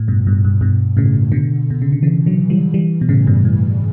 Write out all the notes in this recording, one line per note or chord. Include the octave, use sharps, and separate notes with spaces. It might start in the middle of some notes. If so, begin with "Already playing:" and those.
Already playing: A2
G2 B2
G2 B2
G2
G2 B2
A2 C#3
B2 D3
B2
C#3
D3
C#3 E3
D3 F#3
E3 G3
E3 G3
B2
A2 C#3
G2 B2
A2